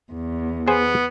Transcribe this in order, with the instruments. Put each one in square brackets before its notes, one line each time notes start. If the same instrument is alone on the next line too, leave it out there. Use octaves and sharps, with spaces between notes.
[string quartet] E2
[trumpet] B3 [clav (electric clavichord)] G#4 C5 G#5